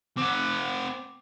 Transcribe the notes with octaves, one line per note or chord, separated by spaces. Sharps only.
C4 F#5 D6